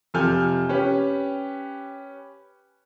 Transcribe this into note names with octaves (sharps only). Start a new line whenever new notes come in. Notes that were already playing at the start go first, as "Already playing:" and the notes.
F2 C3 A4 G#5 F6 G6
C#4 G4 B4